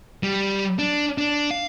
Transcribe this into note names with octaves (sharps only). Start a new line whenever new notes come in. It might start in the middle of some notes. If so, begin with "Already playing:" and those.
G3
D4
D4
F5